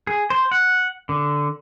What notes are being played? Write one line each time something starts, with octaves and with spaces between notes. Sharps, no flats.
G#4
C5
F#5
D3